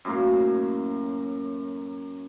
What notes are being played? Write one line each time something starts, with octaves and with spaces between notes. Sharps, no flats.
F#2 A2 A#3